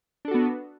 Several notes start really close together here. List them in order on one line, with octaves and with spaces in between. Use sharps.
D4 A4 F#4 B3